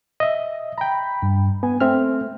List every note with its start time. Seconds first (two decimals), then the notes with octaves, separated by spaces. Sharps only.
0.20 D#5 E5
0.78 G5 A#5 B5
1.22 G2
1.63 B3 G#5
1.80 A3 C4 E5 F6